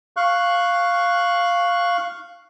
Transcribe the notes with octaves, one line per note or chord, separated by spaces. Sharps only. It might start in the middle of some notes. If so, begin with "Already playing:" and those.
F5 C#6 F#6